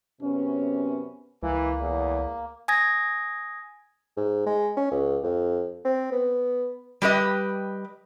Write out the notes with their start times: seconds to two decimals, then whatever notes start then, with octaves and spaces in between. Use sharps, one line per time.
0.21 F#2 C3 B3 C#4
1.43 C#2 E3 A#3
1.80 E2
2.68 G#5 D#6 G#6 A#6
4.17 G#2
4.46 G#3
4.77 C#4
4.91 C#2
5.23 F2
5.84 C4
6.12 B3
7.02 G3 G4 B4 D#5